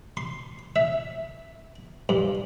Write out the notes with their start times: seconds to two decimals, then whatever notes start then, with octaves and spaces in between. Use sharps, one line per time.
0.17 C6
0.76 E5
2.09 G2